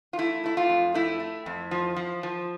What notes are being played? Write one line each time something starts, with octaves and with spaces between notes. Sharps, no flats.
F4
A3 E4
A3 E4
F4
F2
A3 E4
A3
F2
F3
F3
F3